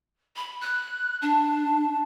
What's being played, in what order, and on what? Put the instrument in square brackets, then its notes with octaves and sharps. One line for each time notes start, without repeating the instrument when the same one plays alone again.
[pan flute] B5
F#6
[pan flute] D4 [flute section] A5